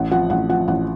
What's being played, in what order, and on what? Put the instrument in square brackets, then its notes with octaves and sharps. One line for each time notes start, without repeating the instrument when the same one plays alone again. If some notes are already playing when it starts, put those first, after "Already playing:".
Already playing: [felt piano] A1 F#5
F3 F#5
A1 F#5
F3 F#5
A1 F#5